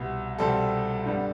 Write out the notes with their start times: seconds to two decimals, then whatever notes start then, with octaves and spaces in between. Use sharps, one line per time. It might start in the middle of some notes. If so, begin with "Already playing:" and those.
Already playing: C2 B2 B3
0.38 C2 B2 G3 C4 A4
1.06 G2 D3 G3 B3